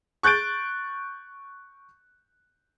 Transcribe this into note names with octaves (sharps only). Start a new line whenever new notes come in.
C#6 F#6 G6 A6 D7